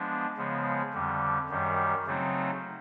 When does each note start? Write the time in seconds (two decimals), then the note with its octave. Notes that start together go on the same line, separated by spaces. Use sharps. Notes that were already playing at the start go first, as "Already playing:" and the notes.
Already playing: F3 G#3 B3 D4
0.37 C#3 F3 G#3 B3
0.94 F2 D3 G3
1.49 F#2 D#3 G3
2.06 C#3 F#3 A3 C4 D#4